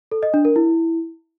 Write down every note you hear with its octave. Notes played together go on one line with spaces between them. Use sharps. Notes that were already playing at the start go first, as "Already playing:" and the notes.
A4
D#5
D4
A#4
E4